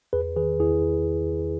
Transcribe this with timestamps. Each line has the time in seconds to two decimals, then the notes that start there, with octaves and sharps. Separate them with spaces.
0.13 E2 G#4 B4
0.36 D#3 G#4 B4
0.60 E2 E4 G#4